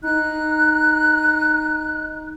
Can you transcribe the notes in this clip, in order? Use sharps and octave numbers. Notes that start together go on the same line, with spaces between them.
D#4 F#6